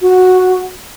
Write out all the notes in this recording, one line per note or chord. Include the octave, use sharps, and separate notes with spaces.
F#4